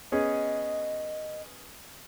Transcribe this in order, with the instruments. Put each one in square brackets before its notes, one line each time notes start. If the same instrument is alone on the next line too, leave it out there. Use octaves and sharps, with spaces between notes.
[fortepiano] B3 C#4 G#4 [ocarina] D#5